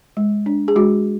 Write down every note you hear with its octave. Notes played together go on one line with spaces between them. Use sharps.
G#3
D4
G#4
G#3 F#4